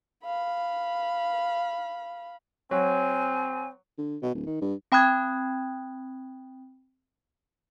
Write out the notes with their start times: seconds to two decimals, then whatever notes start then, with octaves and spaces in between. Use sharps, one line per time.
0.24 F5 B5
2.71 F#3 C4 G#5
3.98 D3
4.22 B2
4.34 D1
4.46 D#3
4.61 G2
4.92 C4 G5 B5 D#6 F#6 G#6